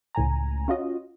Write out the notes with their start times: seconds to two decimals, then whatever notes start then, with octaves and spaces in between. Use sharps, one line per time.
0.15 C#2 A2 G#5 A#5
0.68 C#4 F4 F#4 D#5